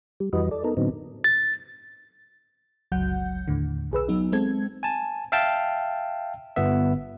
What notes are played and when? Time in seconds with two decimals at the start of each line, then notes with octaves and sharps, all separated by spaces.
0.20 G3
0.33 F2 E3 G3 F#4 B4 D#5
0.51 A4 D5
0.64 B3 D#4 A4 A#4
0.77 A2 D3 F#3 B3 C4 D#4
1.24 A6
2.92 G1 C#2 F#3 F#5 G6
3.48 D#2 A2 D3
3.91 B1 G#4 B4 E6
4.08 F#3 B3 D#4
4.32 G#3 C4 A4 G#6
4.83 G#5 A5
5.32 E5 F5 G5 A5
6.56 G1 B3 E5